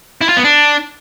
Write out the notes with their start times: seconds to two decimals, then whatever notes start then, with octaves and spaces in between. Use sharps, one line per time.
0.21 E4
0.29 F4
0.37 B3
0.44 D4